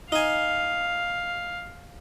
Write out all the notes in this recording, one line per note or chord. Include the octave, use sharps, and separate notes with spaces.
D#4 F5 G#5